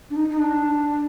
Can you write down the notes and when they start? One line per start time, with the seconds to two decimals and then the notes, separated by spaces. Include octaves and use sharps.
0.10 D4
0.16 D#4
0.30 D#4
0.39 D4